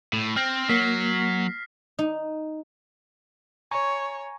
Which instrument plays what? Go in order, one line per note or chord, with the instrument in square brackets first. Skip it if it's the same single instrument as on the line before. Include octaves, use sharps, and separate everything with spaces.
[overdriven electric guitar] A2
[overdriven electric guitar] C4 [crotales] F6 A#6
[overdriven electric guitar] F#3 [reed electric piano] A#3 [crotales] B6 C7
[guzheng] D#4
[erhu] C#5 [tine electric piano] G#5 A#5 C#6